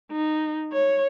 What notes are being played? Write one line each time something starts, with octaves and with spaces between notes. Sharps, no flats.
D#4
C#5